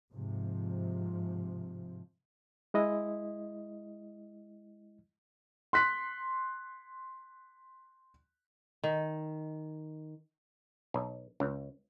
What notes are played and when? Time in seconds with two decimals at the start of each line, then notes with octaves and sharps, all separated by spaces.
0.13 G#2 C3 F3
2.74 G#3 E4 D#5
5.73 C6 F#6 B6
8.84 D#3
10.94 B1
11.40 C#2